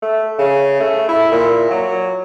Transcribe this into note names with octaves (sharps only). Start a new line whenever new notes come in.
A3
C#3
A3
E4
A#2
F#3